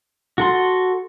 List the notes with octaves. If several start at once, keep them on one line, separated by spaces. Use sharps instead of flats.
F#4 A4 C6